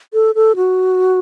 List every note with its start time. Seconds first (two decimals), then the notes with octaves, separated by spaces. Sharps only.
0.14 A4
0.35 A4
0.56 F#4